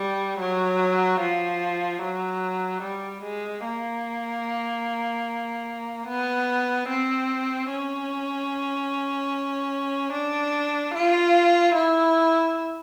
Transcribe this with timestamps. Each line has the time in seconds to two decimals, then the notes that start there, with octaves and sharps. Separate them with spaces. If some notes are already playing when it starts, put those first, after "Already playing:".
Already playing: G3
0.40 F#3
1.21 F3
2.03 F#3
2.83 G3
3.24 G#3
3.65 A#3
6.08 B3
6.89 C4
7.71 C#4
10.13 D4
10.95 F4
11.75 E4